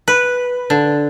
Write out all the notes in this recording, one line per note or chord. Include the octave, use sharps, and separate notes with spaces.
B4
D3